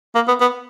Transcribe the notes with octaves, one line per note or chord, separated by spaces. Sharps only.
A#3
B3
B3